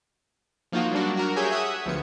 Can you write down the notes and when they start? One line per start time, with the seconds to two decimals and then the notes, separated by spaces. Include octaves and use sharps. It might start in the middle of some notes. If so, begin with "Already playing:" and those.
0.72 F3 A#3 D#4 F4 F#4
0.91 F#3 G3 A#3 D4 F#4
1.17 F#4 A#4
1.36 G4 G#4 C#5 E5 G#5 G6
1.51 E5 F#5 C#6 D#6 G#6
1.86 D2 F3 B3 C#7